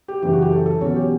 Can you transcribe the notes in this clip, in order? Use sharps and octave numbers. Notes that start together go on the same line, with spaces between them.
G4
F#2 C#3 E3 G4
F#4
G4
A4
A4
E2 B2 F#3 C#4 C#5
G4